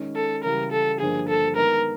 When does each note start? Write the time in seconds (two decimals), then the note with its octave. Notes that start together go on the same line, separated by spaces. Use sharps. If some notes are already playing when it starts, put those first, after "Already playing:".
Already playing: D#3 G#3 C#4
0.16 A4
0.44 C#3 E3 G3 A#4
0.72 A4
1.00 G2 D3 F3 A#3 D4 G#4
1.29 A4
1.56 D#3 G#3 B3 A#4